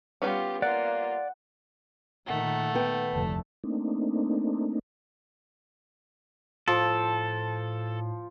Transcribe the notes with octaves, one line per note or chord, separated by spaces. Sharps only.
G3 B3 C#4 F4 G4
A#3 F4 D5 F#5
A#2 D#3 A3 F#5
B3 G5
F1 D2 D3 A5
A3 A#3 C4 D4 D#4
A2 F3 A4